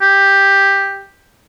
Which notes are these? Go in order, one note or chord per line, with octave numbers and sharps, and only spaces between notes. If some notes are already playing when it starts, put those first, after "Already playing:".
G4